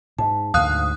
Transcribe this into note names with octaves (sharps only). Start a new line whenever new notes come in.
G#2 A5
D2 G#2 F5 D#6 F#6